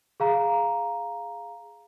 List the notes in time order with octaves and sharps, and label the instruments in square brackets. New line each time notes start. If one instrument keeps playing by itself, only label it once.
[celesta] G#4 F5 A#5